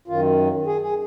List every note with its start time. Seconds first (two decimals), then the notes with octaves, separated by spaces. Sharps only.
0.08 F#2 D#3 F4
0.67 G#4
0.81 G#4